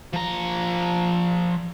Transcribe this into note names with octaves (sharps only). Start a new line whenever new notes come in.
F3 A#5